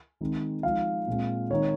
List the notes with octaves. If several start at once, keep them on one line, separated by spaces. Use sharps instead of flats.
D#3 G#3 C4 D#4
F3 G#3 D#4 F5
A#2 G#3 C4
D#3 G#3 C4 D#4 C#5